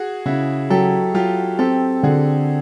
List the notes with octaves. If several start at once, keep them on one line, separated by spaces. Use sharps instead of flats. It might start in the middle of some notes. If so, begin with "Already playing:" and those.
Already playing: F#4 G#4
C#3 E4 F#4
F#3 G4 A4
F#3 F4 G4
C4 G4 A4
D3 F#4 G#4